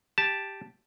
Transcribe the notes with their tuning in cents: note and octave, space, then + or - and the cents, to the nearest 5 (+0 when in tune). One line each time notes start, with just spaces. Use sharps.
G4 +5 A5 +0